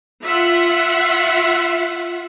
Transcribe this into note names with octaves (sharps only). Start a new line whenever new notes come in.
F4 E5 F#5